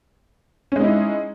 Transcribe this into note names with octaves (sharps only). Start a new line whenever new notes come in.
G#3 C#4 D#4 E4